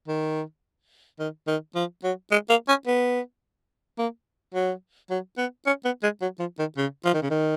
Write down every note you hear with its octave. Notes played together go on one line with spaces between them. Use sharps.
D#3
D#3
D#3
F3
F#3
G#3
A#3
C#4
B3
A#3
F#3
F#3
B3
C#4
B3
G#3
F#3
F3
D#3
C#3
F3
D#3
C#3
D#3